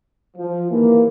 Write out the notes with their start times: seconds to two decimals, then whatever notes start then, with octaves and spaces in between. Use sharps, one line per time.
0.37 F3
0.71 D#2 G#2 E3 A#3